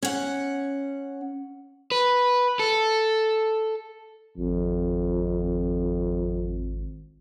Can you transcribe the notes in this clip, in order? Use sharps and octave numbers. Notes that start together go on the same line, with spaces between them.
C#4 F#5
B4
A4
G#1 F2